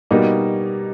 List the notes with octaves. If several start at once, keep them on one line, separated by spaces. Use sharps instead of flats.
B2 G3 A#3 D#4